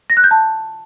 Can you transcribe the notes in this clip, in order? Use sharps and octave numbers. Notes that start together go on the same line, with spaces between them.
A#6
F#6
G6
A5